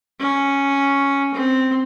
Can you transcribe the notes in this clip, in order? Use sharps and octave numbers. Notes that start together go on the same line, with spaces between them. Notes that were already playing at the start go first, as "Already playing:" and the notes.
C#4
C4